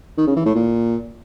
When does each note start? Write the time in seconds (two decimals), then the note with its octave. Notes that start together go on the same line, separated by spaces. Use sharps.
0.17 D#3
0.27 C#3
0.36 E3
0.45 A2
0.55 A#2